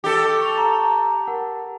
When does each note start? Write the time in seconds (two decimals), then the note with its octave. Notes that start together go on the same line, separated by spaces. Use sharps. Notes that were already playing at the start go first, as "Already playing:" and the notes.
0.04 G4 A4 D#5
0.41 C#6 F7
0.58 A#5
1.27 A#4 F#5